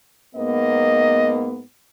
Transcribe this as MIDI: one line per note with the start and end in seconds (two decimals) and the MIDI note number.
0.35 1.61 44
0.35 1.61 58
0.35 1.61 59
0.35 1.55 75